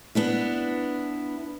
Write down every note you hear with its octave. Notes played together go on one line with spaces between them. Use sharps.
B3 D4 E4